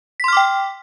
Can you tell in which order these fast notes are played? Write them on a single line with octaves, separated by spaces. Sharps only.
B6 C6 F6 D6 G5